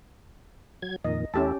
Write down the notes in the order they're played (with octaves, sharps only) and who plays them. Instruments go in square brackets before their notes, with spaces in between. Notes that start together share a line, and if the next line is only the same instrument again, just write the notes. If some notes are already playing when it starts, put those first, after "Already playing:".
[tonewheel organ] F#3 G#6
[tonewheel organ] F2 A#2 D#3 [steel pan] D#5
[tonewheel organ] E2 A3 E4 [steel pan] C#4 G4 A5